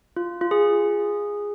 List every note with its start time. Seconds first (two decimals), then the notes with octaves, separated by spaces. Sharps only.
0.17 F4
0.41 F4
0.51 G#4